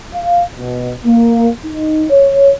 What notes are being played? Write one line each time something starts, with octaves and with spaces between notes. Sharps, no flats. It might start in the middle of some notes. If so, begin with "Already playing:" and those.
F5
B2
A#3
D#4
C#5